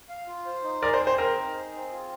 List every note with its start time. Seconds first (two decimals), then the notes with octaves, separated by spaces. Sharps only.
0.09 F5
0.27 F4
0.46 C5
0.64 D#4
0.82 G#4 A#4 D5
0.94 C5
1.00 C4
1.07 C5
1.18 A#4 C5
1.37 D#4
1.55 G#4
1.73 C4
1.92 F4